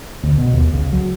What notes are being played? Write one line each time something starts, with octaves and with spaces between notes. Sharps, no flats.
D2
B2
D#2
C#2
F#3